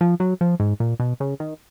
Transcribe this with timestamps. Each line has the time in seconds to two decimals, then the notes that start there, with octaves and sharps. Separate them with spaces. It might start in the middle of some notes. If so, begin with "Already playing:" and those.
0.01 F3
0.20 F#3
0.41 F3
0.60 G#2
0.80 A#2
1.00 B2
1.20 C#3
1.40 D#3